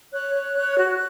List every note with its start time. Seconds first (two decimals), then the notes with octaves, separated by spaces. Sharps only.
0.12 C#5 F#6
0.35 C#5
0.57 C#5
0.79 F#4